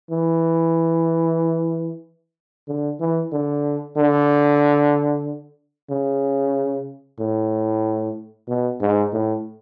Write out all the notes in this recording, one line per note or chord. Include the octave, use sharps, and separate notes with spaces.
E3
D3
E3
D3
D3
C#3
A2
B2
G#2
A2